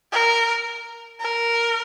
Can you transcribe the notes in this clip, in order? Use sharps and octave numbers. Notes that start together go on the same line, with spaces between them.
A#4
A#4